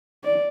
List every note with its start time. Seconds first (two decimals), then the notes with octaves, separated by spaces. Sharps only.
0.24 D5